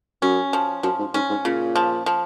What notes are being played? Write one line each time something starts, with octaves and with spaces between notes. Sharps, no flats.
F#2 C#4
F3
F#2 F3
G#2
G#2 C#4
G#2
A#2 C#3
F3
F3